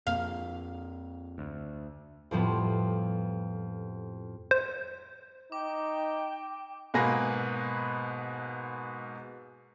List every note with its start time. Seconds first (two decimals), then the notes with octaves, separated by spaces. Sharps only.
0.07 F2 A#3 F5
1.38 D2
2.31 F2 A2 F3 G3 B3 C4
4.51 C5
5.52 D#4 G5 D6
6.94 G#2 B2 A#3 G#4 B4 A#6